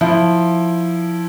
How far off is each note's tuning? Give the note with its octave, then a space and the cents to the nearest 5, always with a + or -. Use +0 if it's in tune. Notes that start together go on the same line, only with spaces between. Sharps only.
F3 +0 E4 +5